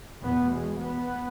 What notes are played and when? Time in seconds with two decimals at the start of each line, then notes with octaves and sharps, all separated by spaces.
0.22 E2 B2 B3
0.52 G#3
0.80 B3